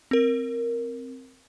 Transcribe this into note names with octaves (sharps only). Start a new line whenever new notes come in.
C4 A#4